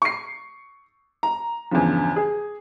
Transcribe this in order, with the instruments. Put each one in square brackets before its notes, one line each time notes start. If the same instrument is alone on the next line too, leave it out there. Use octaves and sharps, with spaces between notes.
[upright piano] C#6 C7
A#5
E2 G2 C#3 F3
G#4